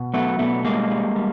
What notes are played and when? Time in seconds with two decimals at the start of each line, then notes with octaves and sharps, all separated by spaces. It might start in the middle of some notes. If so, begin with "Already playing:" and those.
Already playing: B2
0.13 F#3 A3 B3
0.39 B2 A3 B3
0.65 G3 G#3 A#3
0.90 G3
1.16 G3